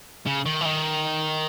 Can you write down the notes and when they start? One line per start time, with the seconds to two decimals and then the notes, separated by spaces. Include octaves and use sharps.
0.26 C#3
0.46 D#3
0.61 E3
0.65 D#3